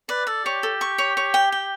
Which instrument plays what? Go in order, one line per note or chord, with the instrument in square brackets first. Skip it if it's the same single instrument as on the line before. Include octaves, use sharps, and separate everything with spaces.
[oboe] B4 [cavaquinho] D5
[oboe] A4 [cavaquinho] D5
[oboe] G4 [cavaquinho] C#5
[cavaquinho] A4
C#6
C#5
C#5
G5
G5